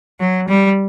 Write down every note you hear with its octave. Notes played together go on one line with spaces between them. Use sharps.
F#3
G3